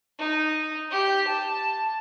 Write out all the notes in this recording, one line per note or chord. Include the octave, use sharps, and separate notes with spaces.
D#4
G4
A5